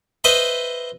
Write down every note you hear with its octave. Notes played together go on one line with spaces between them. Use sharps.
B4 C5 D#5 E5 B5